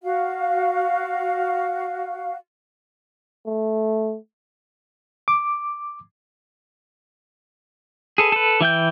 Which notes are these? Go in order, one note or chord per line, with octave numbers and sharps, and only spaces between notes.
F#4 F5
A3
D6
G#4 A4 B4
A4 B4
E3 E4 G5 G6